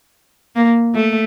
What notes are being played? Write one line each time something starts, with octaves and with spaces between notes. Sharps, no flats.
A#3
A3